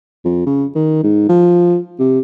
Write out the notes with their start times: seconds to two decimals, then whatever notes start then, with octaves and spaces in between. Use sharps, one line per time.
0.25 F2
0.46 C#3
0.75 D#3
1.03 G#2
1.29 F3
1.99 C3